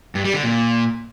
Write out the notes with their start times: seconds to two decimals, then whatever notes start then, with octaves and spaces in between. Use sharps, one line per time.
0.15 G2
0.24 G3
0.34 D3
0.43 A#2